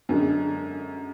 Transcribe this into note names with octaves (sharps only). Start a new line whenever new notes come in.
F#2 D3 G#3 D4